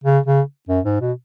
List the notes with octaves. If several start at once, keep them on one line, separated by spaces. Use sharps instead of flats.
C#3
C#3
F#2
G#2
B2